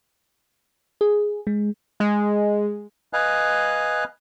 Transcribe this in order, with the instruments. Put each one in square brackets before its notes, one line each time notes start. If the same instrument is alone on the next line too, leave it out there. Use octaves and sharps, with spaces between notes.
[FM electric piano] G#4
G#3
[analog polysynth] G#3
[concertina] B4 D#5 F5 G#5 F#6